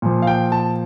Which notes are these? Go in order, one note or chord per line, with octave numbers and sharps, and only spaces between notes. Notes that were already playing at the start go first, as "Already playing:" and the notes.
A#2 F3
F5
G5
A5